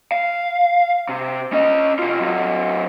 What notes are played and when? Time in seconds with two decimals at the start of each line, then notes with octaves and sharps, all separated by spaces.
0.12 F5
1.09 C3
1.53 C#4 D#5
1.99 C3 F4
2.20 F#3 C4